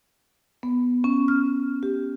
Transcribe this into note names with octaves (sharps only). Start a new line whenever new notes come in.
B3
C#4
F6
G4